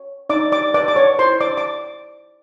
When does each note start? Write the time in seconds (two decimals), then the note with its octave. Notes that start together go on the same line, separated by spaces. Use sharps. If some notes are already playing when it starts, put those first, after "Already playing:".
Already playing: C#5
0.30 D#4 D5 D6
0.52 D5 D6
0.74 B4 D5 D6
0.88 D6
0.96 C#5 C#6
1.19 E4 C5 C6
1.41 D5 D6
1.57 D6